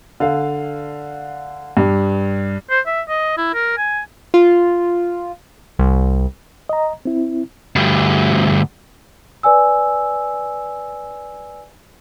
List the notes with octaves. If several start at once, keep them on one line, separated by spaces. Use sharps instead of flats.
D3 F5
G2 G4
C5
E5
D#5
E4
A#4
G#5
F4
C2
D#5 A#5
C4 E4
D2 G2
B4 D5 G#5 E6